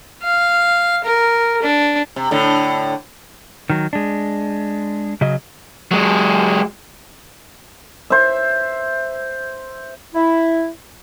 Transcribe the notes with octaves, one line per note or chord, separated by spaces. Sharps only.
F5
A#4
D4
C3
A2 D3
D#3 F#3
G#3 D4
C#3 F#3 D#5
F#3 G#3
C5 E5
E4